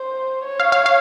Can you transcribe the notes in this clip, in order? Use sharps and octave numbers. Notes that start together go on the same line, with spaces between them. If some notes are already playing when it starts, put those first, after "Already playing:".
Already playing: C5
C#5
F5
F5
F5